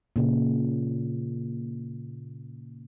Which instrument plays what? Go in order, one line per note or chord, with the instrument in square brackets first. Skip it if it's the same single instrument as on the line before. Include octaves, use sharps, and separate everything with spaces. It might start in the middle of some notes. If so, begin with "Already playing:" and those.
[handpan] A#2 C#3